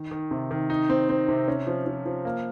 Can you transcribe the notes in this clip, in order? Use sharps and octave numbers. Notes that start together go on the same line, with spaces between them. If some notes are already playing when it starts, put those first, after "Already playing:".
Already playing: D#3
D#3
C3
D#3
D#4
C4
C4
C3
C#4
F3
F3
F3
A#3